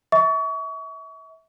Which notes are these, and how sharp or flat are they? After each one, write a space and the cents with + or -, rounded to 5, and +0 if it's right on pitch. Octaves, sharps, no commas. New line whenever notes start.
E5 -30 C#6 +35